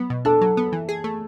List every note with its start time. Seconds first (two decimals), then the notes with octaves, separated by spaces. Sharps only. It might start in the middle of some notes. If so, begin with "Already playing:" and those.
Already playing: F#3 B3
0.10 B2
0.25 D4 A4
0.41 F#3
0.57 B3
0.72 E3
0.89 G#4
1.04 A3